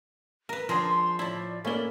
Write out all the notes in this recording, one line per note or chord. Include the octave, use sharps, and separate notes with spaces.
A#4 B4
D3 F3 G#4 A#4 C6
C6
A2 E4 D5
A3 A#3 C#4 E4 G7